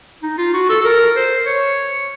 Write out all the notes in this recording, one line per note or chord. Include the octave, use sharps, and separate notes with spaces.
D#4
F4
F#4
A4
A4
A#4
C5
C#5